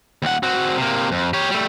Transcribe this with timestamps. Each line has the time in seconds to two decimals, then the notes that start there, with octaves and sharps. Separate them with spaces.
0.22 D#2 F#5
0.43 C4 F#4
0.77 C3 A#3
1.12 F2
1.33 G4 C#5
1.50 G3 A3